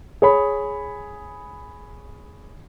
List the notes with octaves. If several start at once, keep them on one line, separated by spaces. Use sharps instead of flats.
G#4 C#5 B5